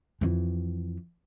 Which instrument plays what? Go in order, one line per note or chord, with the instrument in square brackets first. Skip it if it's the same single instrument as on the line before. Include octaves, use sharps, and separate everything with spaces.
[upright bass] F2 E3